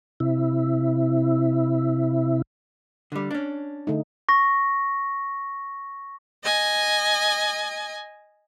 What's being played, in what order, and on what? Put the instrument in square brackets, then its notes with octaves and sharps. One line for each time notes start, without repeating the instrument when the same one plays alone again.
[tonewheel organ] C3 E4
[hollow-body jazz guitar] D3 G3
C#4 D4
[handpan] D3 A3 D#4
[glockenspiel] C#6 A#6
[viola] D#5 G#5